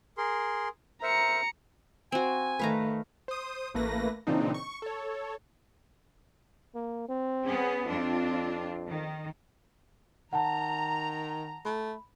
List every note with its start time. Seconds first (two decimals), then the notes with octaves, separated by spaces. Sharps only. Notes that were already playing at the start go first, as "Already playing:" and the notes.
0.18 G#4 A#4 C6
1.02 A#4 C5 E5 A#5 C#7
2.12 C4 F#4 G#5
2.59 D#3 A3 B4 F5 A#5
3.28 C5 D#6
3.74 A1 A3 A#3 B4 A#6
4.27 A#2 C#3 E3 C4 D4 D#4
4.54 C#6
4.82 A4 C#5
6.75 A#3
7.08 C4
7.45 B3 C#4 G#4
7.85 F2 C4 D4 F4
8.88 D#3
10.33 D#3 F#5 A5 A#5
11.65 A3 B5